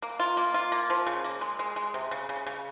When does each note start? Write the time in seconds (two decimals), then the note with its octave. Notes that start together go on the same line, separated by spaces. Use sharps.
0.02 A#3
0.19 F4
0.37 A#3
0.54 F4
0.72 A#3
0.90 F3
1.07 C#3
1.24 A#3
1.41 G#3
1.59 G#3
1.76 G#3
1.94 C3
2.11 C#3
2.29 C#3
2.46 C#3